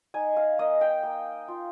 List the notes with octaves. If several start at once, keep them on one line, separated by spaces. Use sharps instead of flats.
D#4 G#5
F5
A#3 D#5
G5
A#3
F4